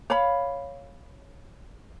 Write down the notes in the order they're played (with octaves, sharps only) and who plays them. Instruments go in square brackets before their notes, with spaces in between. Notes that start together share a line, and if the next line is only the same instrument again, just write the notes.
[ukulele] C#5 F5 B5